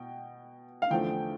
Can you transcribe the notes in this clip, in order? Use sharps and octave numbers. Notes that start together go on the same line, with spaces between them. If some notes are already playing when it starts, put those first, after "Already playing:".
Already playing: B2 G5
F5
E2 D3 F3 A3 G5